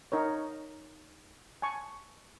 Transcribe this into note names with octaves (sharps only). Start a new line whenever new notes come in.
D#4 A#4 C#5
G#5 A5 C#6